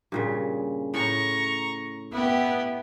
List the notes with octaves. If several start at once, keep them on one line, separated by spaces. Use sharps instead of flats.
G2 A#2 C#3
A2 A#5 C#6
B3 E4 G4